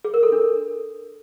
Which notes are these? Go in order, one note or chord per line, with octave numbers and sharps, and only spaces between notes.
G#4
A#4
A4
D4